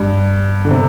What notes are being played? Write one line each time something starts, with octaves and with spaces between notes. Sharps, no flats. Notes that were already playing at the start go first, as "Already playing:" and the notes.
Already playing: G2
D3
C3